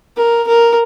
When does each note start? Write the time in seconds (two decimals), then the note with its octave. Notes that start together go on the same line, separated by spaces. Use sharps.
0.17 A#4
0.47 A#4